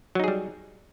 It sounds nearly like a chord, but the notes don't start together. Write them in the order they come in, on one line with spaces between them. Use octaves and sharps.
F#3 D#4 G#4 G3